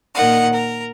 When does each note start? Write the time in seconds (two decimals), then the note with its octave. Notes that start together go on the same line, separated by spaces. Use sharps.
0.15 A#2 D#3 D#5 F#5
0.52 A#4